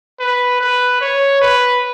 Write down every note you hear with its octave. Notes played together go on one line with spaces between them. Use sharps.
B4
B4
C#5
B4